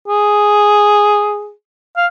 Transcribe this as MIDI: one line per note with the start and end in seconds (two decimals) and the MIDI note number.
0.08 1.52 68
1.97 2.06 77